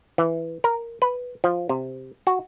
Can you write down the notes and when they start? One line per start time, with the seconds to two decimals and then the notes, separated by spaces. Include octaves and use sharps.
0.18 E3
0.64 A#4
1.02 B4
1.44 F3
1.69 C3
2.27 F#4